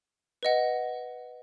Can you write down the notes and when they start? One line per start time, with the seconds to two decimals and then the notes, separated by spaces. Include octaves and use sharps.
0.43 B4 D#5 F#5